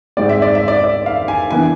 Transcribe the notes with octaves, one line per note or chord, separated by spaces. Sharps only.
G#2 G#3 C4 D5
E5
D5
E5
D5
D5
F5
G#5
E3 B3 D4 G#5